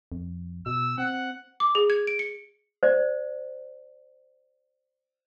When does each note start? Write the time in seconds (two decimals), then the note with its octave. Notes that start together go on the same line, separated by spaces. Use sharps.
0.12 F2
0.66 B2 E6
0.98 C4 F#5
1.60 D6
1.75 G#4
1.90 G#6
2.07 D7
2.19 C#7
2.83 C5 D5